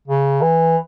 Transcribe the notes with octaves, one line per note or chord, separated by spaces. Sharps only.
C#3
E3